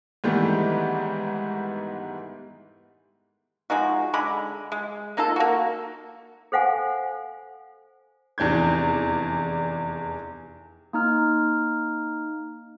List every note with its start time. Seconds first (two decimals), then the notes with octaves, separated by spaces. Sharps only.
0.24 G#2 D#3 E3 G3 A3 B3
3.70 F3 G#3 D#4 F#4
4.14 D3 G#3 B5
4.72 G#3
5.17 A#3 D#4 F4 A4
5.36 A#3 F#4
6.52 A4 C5 F5 F#5 G#5
8.38 F1 E2 D4 G6 G#6
10.93 A#3 D#4 F6